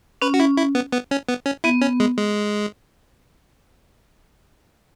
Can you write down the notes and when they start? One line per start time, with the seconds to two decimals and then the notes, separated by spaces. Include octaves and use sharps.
0.22 C#4 B4
0.34 F#4
0.40 E4
0.57 E4
0.75 B3
0.92 B3
1.11 C#4
1.29 B3
1.46 C#4
1.64 B3 E4
1.81 C#4
2.00 G#3
2.18 G#3